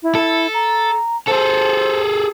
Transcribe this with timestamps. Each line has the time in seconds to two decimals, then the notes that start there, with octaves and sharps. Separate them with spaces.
0.03 E4
0.15 A4
0.54 A#5
1.27 G#4 A4 C5